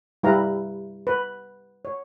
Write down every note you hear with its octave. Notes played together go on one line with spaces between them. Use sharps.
G3 E4 B4 F5 A#5
B4
C#5